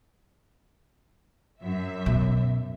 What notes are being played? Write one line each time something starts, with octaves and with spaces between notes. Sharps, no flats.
F#2 E5
B2